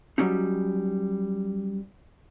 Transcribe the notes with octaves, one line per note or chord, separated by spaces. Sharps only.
F#3 G3 C#4 D#4